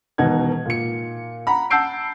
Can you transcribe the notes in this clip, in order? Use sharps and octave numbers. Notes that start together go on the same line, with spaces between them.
E1 B2 D#3 D#4 F#5 G#6
A#2 C#7
F#5 A#5 B5
F#5 A5 E6 G6 C7 D7